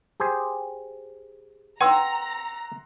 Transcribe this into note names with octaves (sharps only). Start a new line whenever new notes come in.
G4 G#4 C5
B4 F#5 G5 A#5 C6 E6